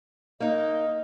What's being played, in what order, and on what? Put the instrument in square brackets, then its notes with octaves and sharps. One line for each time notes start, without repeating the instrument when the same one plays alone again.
[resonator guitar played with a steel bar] A#3 D#4 [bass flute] D#5